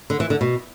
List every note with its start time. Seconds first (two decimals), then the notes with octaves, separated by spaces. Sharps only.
0.10 D3
0.20 E3
0.30 D3
0.41 B2